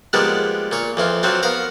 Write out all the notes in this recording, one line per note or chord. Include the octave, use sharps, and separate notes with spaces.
F3 G3 G#3 A#3 B3 D4
A#2 C#5
F2 E3 F4
F3 F#3 C4 D4
B3 A#4 F5 A#5